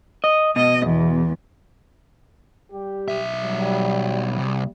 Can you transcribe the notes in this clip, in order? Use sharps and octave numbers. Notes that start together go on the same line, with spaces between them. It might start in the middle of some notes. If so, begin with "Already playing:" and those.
D#5
B2 D#5
E2
G3 G4
B1 E5
F#3 G3
C2